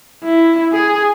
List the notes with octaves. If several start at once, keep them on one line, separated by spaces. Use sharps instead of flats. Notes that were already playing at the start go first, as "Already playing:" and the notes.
E4
G#4